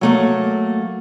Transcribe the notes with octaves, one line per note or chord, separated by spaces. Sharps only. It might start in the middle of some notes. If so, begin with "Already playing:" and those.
F#3 A3 A#3